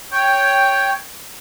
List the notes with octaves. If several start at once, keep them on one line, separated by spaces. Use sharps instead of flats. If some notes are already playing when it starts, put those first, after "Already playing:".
C#5 G5